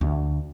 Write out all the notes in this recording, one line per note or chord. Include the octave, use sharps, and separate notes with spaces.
D2